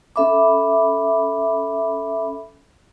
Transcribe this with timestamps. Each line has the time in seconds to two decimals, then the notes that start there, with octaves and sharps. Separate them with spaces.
0.16 C#4 A4 E5 B5 D6